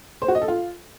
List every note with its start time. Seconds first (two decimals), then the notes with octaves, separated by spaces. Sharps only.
0.22 C5
0.28 F#4
0.35 D#5
0.42 A4
0.48 F4